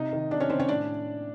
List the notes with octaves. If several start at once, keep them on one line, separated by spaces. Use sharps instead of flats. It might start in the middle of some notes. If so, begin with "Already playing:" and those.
Already playing: C3 D#4 D#5
D#3
C3 D4 D5
C#4 C#5
D#3 C4 C5
C#4 C#5
A2 D4 D5